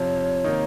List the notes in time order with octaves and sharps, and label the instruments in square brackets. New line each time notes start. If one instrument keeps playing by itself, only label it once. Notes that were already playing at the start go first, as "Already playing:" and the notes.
Already playing: [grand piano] F2 C3 F3 [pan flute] C#5
[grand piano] C3 D#3 A#3 D#4